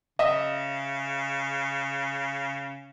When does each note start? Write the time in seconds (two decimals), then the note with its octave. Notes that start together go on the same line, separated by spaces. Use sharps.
0.19 C#3 D#5 E5